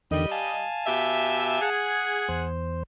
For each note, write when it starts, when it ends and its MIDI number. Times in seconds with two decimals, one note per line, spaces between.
0.11 0.26 40
0.11 0.26 50
0.11 0.26 51
0.11 0.62 55
0.11 0.62 75
0.31 1.70 77
0.31 1.70 80
0.31 1.70 81
0.86 1.58 47
0.86 1.58 67
0.86 1.58 76
1.62 2.45 68
1.62 2.45 78
2.29 2.83 40
2.29 2.83 72